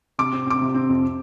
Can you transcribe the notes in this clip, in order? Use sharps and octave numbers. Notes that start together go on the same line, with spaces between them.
C3 D6
C4
C4 D6
C3
C4
F2